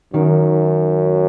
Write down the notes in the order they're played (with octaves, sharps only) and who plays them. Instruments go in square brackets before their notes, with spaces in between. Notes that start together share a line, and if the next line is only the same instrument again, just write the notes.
[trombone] F#2 [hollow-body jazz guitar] D#3